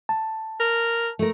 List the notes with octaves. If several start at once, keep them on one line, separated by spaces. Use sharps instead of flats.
A5
A#4
A3 A#4